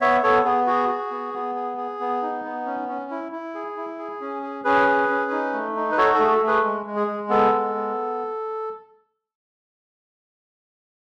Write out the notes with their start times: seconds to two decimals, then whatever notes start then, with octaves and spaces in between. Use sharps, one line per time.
0.01 B3 C#5 E5
0.23 B3 A4 C#5
0.45 B3 G#4
0.67 F#4 G#4
0.89 F#4
1.11 B3
1.34 B3
1.55 G#4
1.78 G#4
2.00 B3
2.22 D#4
2.45 B3
2.66 C#4
2.89 C#4
3.11 E4
3.32 E4
3.55 G#4
3.77 E4
3.98 G#4
4.21 C#4
4.43 G#4
4.64 C#4 G#4 B4
4.88 G#4
5.08 C#4
5.31 D#4
5.53 A3
5.76 D#4
5.92 B4
5.97 F#4 A4 C#5
6.14 A4
6.19 A3 G#4
6.30 A4
6.41 A3
6.47 G#4 B4
6.63 G#3
6.86 G#3
6.96 G#4
7.07 G#3
7.29 B3 A4
7.52 G#3
7.75 B3